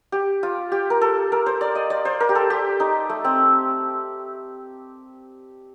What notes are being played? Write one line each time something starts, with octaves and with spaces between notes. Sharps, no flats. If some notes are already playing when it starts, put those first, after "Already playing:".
G4
F4
G4
A#4
A4
A#4
C5
D5
D#5
D5
C5
A#4
G4
A4
G4
D#4
A3
C4